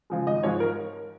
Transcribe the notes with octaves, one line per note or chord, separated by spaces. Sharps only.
C#3 F3 G#3
G#1 D#5
G#2 F3 C#5
A#4